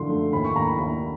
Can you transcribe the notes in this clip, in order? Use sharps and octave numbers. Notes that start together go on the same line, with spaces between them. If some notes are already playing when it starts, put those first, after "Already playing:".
Already playing: F#2 D3 F3 C6
A3
D#2 B5
C#6
D#2 A#5
B5
D#2 B5